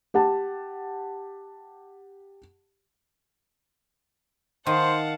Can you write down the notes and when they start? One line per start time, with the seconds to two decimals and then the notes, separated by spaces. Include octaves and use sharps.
0.14 G4 F#5 A5
4.66 D#3 C5 F5 F#5 A5